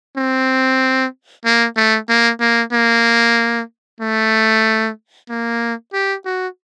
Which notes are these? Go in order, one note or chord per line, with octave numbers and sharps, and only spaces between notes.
C4
A#3
A3
A#3
A#3
A#3
A3
A#3
G4
F#4